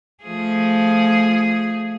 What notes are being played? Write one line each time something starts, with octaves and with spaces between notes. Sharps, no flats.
F3 A3 G#4